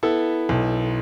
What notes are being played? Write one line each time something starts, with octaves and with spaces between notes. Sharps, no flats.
B3 E4 A4
B1